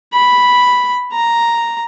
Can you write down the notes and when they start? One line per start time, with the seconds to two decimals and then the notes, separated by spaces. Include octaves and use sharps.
0.14 B5
1.13 A#5